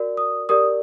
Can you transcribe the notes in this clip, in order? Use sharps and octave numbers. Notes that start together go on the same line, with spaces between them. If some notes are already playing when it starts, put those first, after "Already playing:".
Already playing: F#4 A#4 D5
D#6
G4 A#4 D5 D#6